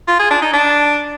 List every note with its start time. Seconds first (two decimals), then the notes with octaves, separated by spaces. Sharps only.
0.08 F4
0.19 G#4
0.31 D4
0.42 D#4
0.53 D4